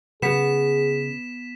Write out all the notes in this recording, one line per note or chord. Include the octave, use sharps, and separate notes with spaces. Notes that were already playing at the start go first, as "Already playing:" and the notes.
C#3 B3 G#4 B6 E7